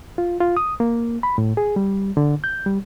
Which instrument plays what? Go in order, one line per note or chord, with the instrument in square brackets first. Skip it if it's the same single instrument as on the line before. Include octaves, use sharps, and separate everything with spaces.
[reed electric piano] F4
F4
D#6
A#3
B5
A2
G#4
G3
D3
G6
G3